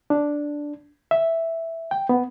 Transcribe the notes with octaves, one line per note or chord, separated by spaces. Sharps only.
D4
E5
G5
B3